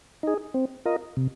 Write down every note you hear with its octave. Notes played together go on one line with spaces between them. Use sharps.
D#4 G#4
C4
F4 A#4 D#5
C3